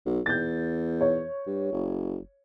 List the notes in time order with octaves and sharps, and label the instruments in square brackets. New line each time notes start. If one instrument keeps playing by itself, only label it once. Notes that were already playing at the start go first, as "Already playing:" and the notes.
[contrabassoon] B1
[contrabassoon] E2 [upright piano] G6 A6
[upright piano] C#5
[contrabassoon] G2
F#1